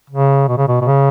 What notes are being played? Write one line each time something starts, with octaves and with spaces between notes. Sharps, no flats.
C#3
B2
C#3
B2
B2
C#3